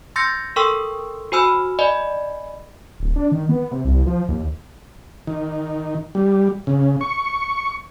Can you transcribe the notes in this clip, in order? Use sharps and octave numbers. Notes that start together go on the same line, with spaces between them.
C6 E6 G6 A6 A#6 C#7
A4 A#4 G5 C6 C#6 E6
F#4 C5 G#5 B5 E6 F6
D5 D#5 G#5 B5
D1
D4
D#3
B3
C3
C2
F3
D#2
D#3
G3
C#3
C#6